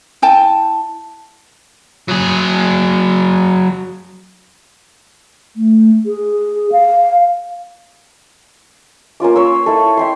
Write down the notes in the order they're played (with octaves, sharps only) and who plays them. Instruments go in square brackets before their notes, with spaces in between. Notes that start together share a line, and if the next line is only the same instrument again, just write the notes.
[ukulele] E4 G5 A5
[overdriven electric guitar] F#3 G#4
[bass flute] A3
G#4
F5
[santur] A#3 C#4 F4 D6
C#5 C6 E6
E4 A4
E5 G5 C6